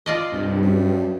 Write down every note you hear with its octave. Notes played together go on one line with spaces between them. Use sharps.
F4 D5 D#5
C2 G2
F#2